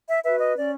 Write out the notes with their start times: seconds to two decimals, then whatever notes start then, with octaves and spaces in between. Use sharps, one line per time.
0.09 E5
0.24 F#4 B4 E5
0.39 D#5
0.55 C#4 D5